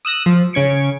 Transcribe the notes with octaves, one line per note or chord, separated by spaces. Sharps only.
D#6 E6 F#6 A#6
F3
C#3 C#4 G#6 C#7 D7